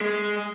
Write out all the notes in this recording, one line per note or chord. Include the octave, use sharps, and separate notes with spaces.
G#3